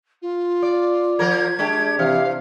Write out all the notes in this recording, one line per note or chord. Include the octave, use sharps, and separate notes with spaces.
F4
D5
F3 A#4 G#6
G#3 D4 G4
C3 E3 F5 F6